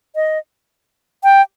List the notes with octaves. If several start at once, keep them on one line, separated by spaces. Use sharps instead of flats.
D#5
G5